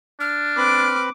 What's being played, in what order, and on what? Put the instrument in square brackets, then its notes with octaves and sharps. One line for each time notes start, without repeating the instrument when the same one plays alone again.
[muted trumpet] D4 [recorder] F6
[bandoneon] C4 B4 B5 [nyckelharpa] D6